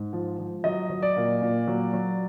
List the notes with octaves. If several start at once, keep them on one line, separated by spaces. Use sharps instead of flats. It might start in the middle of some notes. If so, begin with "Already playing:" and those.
Already playing: G#2
F3
F3
F#3 D#5
F#3
D5
A#2
A#2
F#3
F#3